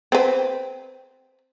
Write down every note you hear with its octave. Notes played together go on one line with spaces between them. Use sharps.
C4 B4